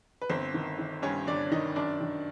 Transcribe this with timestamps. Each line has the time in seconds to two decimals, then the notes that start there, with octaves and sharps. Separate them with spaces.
0.22 B4
0.29 G1 C4 C5
0.54 D#3
0.79 D#3
1.02 G2 C#4 C#5
1.27 G1 D4 D5
1.51 D#3 D#4 D#5
1.76 F#2 D4 D5
2.01 D#3